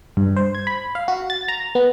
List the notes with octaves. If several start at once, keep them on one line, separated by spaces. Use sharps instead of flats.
G2
C5
G#6
B5
F5
F#4
A6
A#5
B3